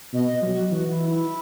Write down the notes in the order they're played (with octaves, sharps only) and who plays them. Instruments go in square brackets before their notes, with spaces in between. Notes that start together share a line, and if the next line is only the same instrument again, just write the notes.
[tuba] B2 [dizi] D#5
[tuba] F#3
[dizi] F#4
[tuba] E3 [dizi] F#4
[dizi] E4
E4